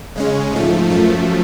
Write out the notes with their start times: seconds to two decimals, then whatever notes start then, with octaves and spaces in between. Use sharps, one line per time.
0.16 C#3 G#3 C#4
0.53 G#2 F3 A3
0.90 F#2 F3 A3